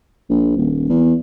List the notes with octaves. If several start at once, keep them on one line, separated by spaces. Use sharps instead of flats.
A#1
D#1
E2